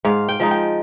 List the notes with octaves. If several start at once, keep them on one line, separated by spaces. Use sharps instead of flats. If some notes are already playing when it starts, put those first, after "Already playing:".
G#2 F5
G5
F3 G#3 D#4
G5